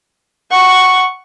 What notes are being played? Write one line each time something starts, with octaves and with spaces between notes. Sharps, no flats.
F#5 C#6